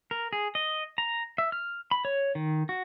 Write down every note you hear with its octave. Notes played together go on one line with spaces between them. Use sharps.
A#4
G#4
D#5
A#5
E5
F6
B5
C#5
D#3
F#4